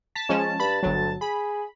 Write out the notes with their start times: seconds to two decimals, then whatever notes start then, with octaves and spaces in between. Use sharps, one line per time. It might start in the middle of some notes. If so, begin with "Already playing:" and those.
0.15 A5 B6
0.29 F3 G#3 C#4
0.60 G2 B5
0.83 G1 D2 F#3
1.21 G#4 B5